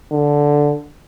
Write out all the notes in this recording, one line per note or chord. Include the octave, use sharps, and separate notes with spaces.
D3